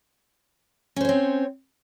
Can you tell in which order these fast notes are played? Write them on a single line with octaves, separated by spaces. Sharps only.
C#4 C5 C#5 C4